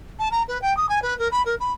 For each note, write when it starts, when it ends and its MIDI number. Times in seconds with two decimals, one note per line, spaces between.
0.19 0.28 81
0.31 0.42 82
0.48 0.60 71
0.61 0.75 79
0.77 0.86 87
0.89 1.01 80
1.02 1.17 71
1.18 1.28 70
1.31 1.42 83
1.45 1.55 70
1.60 1.72 83